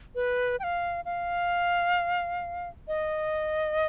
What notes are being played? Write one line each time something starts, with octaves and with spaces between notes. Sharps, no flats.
B4
G5
F5
F5
D#5